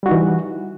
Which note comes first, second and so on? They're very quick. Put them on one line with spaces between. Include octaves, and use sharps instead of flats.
G3 F#4 D#4 E3